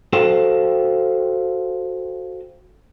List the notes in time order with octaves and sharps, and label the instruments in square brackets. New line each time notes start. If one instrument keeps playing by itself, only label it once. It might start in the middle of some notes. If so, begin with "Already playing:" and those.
[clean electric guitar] F#4 A4 C5 F5 G5